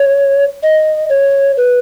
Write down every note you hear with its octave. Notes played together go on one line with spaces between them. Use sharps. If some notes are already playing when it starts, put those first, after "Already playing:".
Already playing: C#5
D#5
C#5
B4